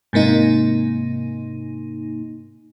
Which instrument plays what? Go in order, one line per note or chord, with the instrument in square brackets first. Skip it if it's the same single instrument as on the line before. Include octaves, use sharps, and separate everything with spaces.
[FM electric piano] G#2 C3 A#3 D#4